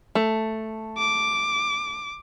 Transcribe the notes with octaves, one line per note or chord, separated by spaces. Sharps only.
A3
D6